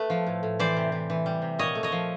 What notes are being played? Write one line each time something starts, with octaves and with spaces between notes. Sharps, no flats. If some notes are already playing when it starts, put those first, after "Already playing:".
Already playing: A3 B4
F3
A2
A2
E3 C5 D5
C3
E3
E3
G3
C3
A#2 C#5 D#5
A3
C#5 D#5
F3